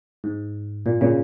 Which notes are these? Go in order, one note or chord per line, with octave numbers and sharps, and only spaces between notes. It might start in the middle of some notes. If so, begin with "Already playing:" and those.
G#2
A#2
A#2 C#3